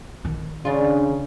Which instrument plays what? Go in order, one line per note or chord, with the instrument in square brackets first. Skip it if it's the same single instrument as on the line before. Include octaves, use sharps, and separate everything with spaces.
[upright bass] D#3
[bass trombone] C#3 [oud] D4 F4